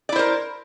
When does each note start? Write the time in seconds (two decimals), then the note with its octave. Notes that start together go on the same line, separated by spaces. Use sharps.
0.09 D5
0.12 E4
0.16 C5
0.19 A#4